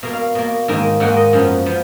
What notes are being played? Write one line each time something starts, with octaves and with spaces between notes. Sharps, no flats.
B2 A#3 F5
F5
B2 A#3
G#2 D#3 A#3
G#2 D#3 A#3 F#5
D#5
F#2 F3 B3
F3 B3